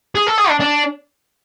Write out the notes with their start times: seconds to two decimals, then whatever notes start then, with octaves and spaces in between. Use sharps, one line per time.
0.15 G#4
0.27 A4
0.38 G#4
0.49 D4
0.60 D4